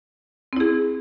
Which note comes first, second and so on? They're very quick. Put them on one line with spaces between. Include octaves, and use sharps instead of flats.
C4 E4 G#4